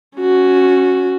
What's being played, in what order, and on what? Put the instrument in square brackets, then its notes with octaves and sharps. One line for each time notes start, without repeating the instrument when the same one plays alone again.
[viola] C#4 F#4